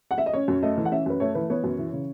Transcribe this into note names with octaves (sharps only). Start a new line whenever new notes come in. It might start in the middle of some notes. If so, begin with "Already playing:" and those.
F#5
E5
D#5
C#4 C#5
F#2
A3 D#5
E3
F#5
C#4 E5
F#2 B4
A3 C#5
E3 B4
B3 C#5
F#2
E3
C#3